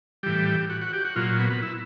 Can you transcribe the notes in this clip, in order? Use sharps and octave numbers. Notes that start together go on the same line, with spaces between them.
A2 E3 G3 G4
F#4
F#4
G4
F#4
A#2 F#3 F4
B3
B3
E4